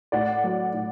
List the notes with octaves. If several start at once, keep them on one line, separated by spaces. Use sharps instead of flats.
A2 D5 F#5
F#3
A2